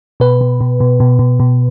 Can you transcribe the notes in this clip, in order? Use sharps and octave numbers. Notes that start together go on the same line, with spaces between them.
B2 B4
B2
B2
B2
B2
B2
B2